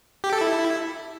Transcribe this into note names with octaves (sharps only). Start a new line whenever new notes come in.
G4
A4
E4